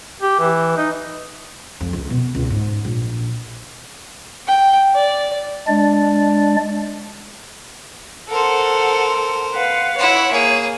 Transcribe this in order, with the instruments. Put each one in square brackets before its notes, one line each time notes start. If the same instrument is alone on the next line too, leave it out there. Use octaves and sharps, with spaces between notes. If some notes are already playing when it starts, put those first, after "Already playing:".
[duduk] G4
E3
D#4
[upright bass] F2
C#2
B2
C#2
G#2
A#1
[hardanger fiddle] G5
D5
[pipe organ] G#3 D4 D5
[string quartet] A4 F#5 [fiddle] A#4 C5
[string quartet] B4 F5 F#5
[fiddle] E4 F#5 [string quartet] C#5
[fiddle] A#3 G#4